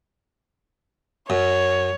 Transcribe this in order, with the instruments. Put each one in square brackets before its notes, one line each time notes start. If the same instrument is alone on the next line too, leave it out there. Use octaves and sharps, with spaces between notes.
[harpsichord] F#2 [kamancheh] C#5